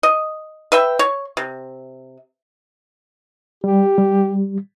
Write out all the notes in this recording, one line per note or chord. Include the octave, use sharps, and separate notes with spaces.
D#5
B4 E5 G5
C#5
C3
G3 G4
G3